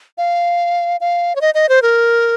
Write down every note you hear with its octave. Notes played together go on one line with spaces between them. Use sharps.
F5
F5
C#5
D#5
D#5
C5
A#4